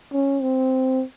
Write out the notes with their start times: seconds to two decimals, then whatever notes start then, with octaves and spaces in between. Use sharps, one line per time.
0.13 C#4
0.42 C4